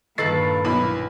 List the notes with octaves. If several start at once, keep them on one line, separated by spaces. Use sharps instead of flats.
G2 A#2 D#3 A4 B4 A6 C7
B1 E4 B5